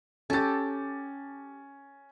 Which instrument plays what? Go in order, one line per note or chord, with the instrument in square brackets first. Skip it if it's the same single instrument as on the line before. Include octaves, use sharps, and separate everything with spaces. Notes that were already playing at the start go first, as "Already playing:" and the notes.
[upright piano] C#4 A6 [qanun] G4 A4